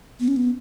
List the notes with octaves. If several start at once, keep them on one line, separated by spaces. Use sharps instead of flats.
B3
C#4
B3